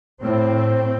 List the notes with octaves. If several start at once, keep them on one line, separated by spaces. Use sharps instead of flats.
A2 C4